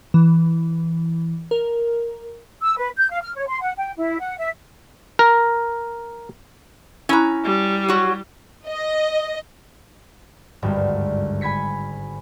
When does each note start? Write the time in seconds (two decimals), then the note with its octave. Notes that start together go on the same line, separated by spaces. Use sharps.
0.14 E3
1.51 A#4
2.62 E6
2.78 B4
2.97 G6
3.10 F5
3.23 F6
3.36 C#5
3.48 C6
3.61 F#5
3.77 G5
3.97 E4
4.20 F#5
4.38 E5
5.19 A#4
7.09 C#4 E4 A#5 B5 F#6
7.44 G3
7.89 F#3 F#4
8.68 D#5
10.62 G#1 D2 G2
11.41 G#5 B5 G#6 B6 C#7